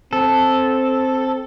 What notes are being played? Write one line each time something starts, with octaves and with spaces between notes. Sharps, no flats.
C4 A4